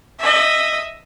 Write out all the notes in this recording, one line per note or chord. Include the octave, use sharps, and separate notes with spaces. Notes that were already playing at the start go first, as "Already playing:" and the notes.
D#5 E5